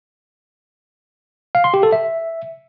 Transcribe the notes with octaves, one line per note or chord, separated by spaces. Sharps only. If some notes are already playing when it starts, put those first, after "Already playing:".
F5
C6
G4
A4
E5